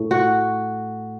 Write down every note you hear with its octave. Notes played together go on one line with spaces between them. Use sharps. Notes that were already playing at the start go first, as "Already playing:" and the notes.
Already playing: A2
F#4